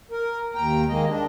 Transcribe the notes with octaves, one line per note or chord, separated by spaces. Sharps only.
A#4
D#2 G5 A#5
D#3 G#3 A#3 D#5
D4